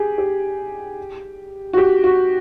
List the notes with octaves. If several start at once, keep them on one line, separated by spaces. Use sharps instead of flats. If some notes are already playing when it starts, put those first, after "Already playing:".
Already playing: G4 G#4
G4
F#4
G4
F#4